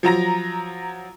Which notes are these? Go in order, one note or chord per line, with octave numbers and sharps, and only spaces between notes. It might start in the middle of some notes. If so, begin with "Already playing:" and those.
F3 F#3 A#5 A#6